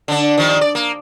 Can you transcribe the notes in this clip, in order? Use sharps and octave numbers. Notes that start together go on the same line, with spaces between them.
D3 D4
D#3 F3 G3
D5
A#3